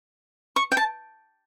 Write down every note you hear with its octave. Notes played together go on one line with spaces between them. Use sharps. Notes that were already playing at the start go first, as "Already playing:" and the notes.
C#6
G5
A5